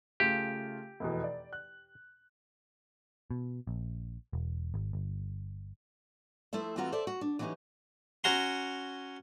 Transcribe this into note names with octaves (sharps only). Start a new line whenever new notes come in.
C#3 A3 F4 G4
F1 E2 B2
D5
F#6
B2
A#1
E1
G#1
G1
F3 A3 E4 C5 E5
E3 A3 C4 F4 F#4 A#5
A4 C5 D5 E5 A5
F#4
D4
E3 F#3 B3 C#4 D#4 G4
C#4 F#4 A#5 C6